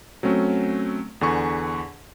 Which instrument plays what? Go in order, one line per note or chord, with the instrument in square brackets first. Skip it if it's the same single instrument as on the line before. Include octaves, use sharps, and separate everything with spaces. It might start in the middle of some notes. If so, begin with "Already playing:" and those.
[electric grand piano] F#3 A3 C4 C#4
E2 D3 G#5 C#6